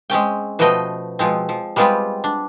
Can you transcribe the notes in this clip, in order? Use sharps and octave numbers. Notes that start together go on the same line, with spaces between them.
G#3 C4 C#4 G5
B2 F3 A3 B3 D#5 G5
B2 F3 G#3 C4
F3
G3 G#3 B3 C4 F4 G4
D4